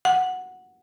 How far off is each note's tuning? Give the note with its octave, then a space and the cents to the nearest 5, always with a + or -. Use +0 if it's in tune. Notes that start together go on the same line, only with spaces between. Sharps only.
F#5 -5